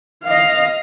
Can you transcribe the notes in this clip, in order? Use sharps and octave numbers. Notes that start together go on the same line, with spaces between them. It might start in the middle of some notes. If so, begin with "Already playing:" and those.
D#5 F5